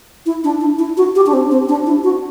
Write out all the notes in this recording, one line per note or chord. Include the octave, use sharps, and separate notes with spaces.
E4
D4
E4
E4
F#4
G4
D4
C4
C4
D4
E4
F#4